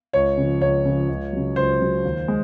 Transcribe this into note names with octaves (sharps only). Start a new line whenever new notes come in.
C#2 C#5
C#3 F3
C#2 C#5
C#3 F3
C#2
C#3 F#3
C#2 C5
C#3 F#3
D#2
G#3